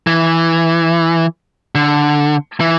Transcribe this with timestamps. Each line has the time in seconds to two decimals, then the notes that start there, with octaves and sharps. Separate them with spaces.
0.07 E3
1.75 D3
2.60 E3